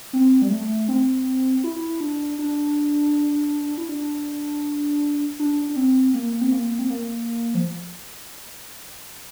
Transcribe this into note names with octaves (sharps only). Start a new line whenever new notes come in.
C4
G3
A3
C4
E4
D4
D4
E4
D4
D4
D4
C4
A#3
C4
A#3
C4
A#3
F3